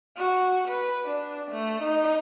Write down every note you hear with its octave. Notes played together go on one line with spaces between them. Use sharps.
F#4
B4
D4
A3
D#4